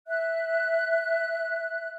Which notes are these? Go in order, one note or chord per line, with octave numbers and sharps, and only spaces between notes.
E5 F#6